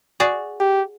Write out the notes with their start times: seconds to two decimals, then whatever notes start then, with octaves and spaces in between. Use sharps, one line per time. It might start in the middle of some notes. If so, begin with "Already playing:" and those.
0.20 F#4 G#4 D5
0.60 G4